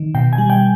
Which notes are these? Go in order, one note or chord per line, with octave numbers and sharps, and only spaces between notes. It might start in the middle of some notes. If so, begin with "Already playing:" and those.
Already playing: D#3
B2 G5
G#5
G3
G5